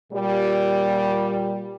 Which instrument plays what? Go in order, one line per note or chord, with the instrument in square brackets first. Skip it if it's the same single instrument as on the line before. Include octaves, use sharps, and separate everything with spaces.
[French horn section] A#2 G3